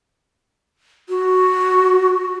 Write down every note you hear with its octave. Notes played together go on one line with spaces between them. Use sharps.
F#4